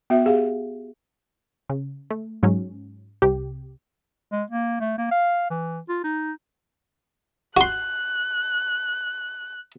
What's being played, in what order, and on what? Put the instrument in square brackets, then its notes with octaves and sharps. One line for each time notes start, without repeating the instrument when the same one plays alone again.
[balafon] B3 F#4 E5
G4 G#4 F5
[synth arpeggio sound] C#3
A3
G#2 F#3 C#4
C2 C3 G4
[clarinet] G#3
A#3
A3
A#3
F5
E3
F4
D#4
[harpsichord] F#4 C6 [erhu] F#6